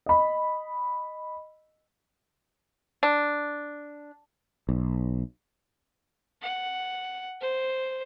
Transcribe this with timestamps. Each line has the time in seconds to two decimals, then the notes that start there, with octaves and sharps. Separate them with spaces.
0.06 D#5 B5
3.03 D4
4.69 B1
6.42 F#5
7.41 C5